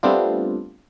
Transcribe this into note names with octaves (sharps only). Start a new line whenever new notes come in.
G3 A3 B3 C4 D4 F4